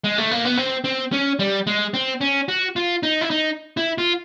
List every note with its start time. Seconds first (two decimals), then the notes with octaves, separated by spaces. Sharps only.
0.04 G#3
0.18 A3
0.31 A#3
0.45 B3
0.57 C4
0.84 C4
1.12 C#4
1.39 G3
1.67 G#3
1.94 C4
2.21 C#4
2.48 F#4
2.76 F4
3.03 D#4
3.21 E4
3.30 D#4
3.77 E4
3.98 F4